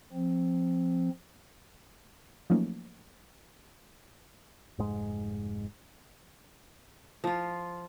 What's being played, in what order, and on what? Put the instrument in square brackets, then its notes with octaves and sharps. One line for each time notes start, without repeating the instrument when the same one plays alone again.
[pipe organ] F3 C4
[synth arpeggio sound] F3 F#3 A3 A#3 C#4 D#4
[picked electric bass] F1 G#2 G#3
[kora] F3 F4